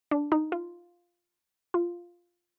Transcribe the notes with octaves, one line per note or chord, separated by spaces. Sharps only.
D4
D#4
F4
F4